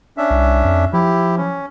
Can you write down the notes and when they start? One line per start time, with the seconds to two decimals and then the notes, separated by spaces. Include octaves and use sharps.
0.17 C#4 D4 E5
0.30 C2
0.65 F2
0.93 F3 E4 G4
1.37 C#4